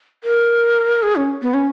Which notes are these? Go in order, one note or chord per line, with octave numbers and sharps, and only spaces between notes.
A#4
G#4
C#4
B3
C#4